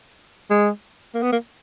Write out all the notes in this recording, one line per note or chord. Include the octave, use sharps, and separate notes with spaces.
G#3
A#3
B3
A#3